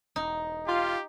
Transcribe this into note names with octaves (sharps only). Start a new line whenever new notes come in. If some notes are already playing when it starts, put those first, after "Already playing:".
E1 D#4
F4 G4